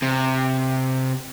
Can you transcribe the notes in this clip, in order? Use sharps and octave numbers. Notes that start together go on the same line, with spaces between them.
C3